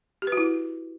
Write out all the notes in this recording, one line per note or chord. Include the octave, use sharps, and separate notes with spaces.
G4
B4
F#4
E4